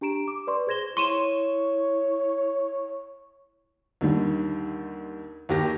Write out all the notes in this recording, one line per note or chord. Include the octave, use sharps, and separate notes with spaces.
D4 G4 A#5 D7 E7
D6
B4 D5 C6 C#6
G#4 C5 G#6 A#6 E7 G7
E4 C#5 C6 C#6 D#7 E7
D#2 D3 D#3 G3
D#2 F#4 G4 A#4 A#6